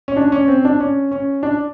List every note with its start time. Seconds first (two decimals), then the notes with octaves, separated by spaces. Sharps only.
0.08 C#4
0.16 D4
0.32 C#4
0.48 C4
0.65 D4
0.80 C#4
1.11 C#4
1.43 D4